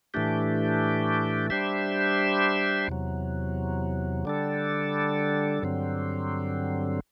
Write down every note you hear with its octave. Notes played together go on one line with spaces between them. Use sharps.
A2 E3 A3 D4 G4
G3 D4 G4 C5 E5
E2 C3 F#3
D3 G3 D4 A4
G2 D3 F#3 C4